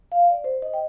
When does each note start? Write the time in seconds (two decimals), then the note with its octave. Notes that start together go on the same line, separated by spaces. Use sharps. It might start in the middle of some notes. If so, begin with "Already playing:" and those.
0.12 F5
0.30 D5
0.44 C5
0.62 D#5
0.74 G5